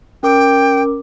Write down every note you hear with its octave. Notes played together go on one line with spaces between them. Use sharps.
C#4 A#4 G5 D6